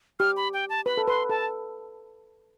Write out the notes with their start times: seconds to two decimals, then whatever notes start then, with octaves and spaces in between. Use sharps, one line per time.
0.19 G4 F6
0.37 B5
0.53 G5
0.70 A5
0.86 B4 B5
0.97 A4
1.07 B4 C6
1.30 A4 A5